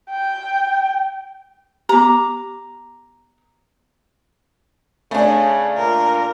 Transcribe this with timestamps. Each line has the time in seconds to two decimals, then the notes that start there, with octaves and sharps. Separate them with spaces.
0.10 G5
1.89 B3 G4 A#5 D6
5.11 C#3 A3 D4
5.77 A#2 A#4